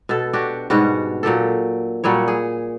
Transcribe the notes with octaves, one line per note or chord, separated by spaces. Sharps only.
B2 A4
D4 F#4 G4
G#2 B2 G3 F#4
A#2 F#3 G4 A4
A#2 F#3 G3 C#5
G#4